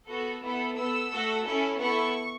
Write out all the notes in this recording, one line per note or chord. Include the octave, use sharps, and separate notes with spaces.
B3 F#4 A4
B3 E4 A4
B3 A4 E6
A3 F#4 A4
C#4 E4 A4
B3 E4 A4 C#6